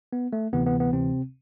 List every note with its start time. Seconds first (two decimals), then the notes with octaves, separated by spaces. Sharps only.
0.13 B3
0.33 A3
0.53 D2 C3 E3 B3
0.66 B3
0.80 B3
0.93 C3 C4